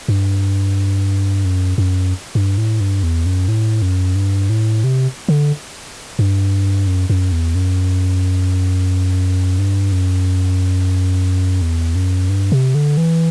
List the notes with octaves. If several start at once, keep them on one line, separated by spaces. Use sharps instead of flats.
G2
F#2
F#2
G2
A2
G2
E2
F#2
A2
F#2
G2
A2
C3
D3
G2
F#2
F#2
E2
F#2
G2
F#2
E2
F#2
G2
C3
D3
E3